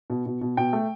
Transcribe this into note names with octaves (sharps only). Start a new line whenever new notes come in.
B2
B2
B2
B2 G5
A3